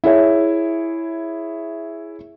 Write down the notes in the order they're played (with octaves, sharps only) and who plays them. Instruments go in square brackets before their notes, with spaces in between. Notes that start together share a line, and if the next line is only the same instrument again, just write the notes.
[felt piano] E4 G#4 C#5 E5